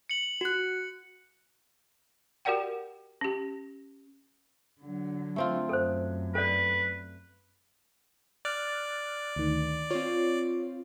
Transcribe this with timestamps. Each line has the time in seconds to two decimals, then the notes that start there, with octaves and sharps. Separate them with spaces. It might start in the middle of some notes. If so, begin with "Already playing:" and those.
0.09 C#7 F#7
0.41 F#4 F#6
2.45 F#4 G4 A#4 D5 F#5 G5
3.21 C#4 G4
4.81 D3 F#3
5.36 A3 C4 F4
5.69 F#2 A4 C5
6.35 A4 B4 D5
8.45 D5 F6 F#6 A6
9.36 D2 D#3
9.90 C4 F4 C#5